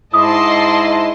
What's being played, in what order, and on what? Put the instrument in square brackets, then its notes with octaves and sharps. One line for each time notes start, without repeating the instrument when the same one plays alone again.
[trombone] G#2 [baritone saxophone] E4 [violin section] D#5 A5 C6 [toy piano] D6 D#6